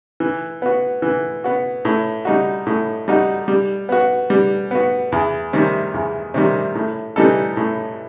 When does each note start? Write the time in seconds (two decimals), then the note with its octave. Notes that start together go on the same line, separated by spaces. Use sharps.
0.20 E3
0.62 B3 F#4
1.02 E3
1.44 B3 F#4
1.85 A2
2.25 G3 D#4 F#4
2.66 A2
3.08 G3 D#4 F#4
3.48 G3
3.89 B3 F#4
4.30 G3
4.71 B3 F#4
5.12 E2
5.53 C3 D#3 G3
5.94 E2
6.34 C3 D#3 G3
6.75 A2
7.16 E3 G3 D#4 A4
7.57 A2